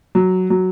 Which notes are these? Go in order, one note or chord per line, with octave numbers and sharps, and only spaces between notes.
F#3
F#3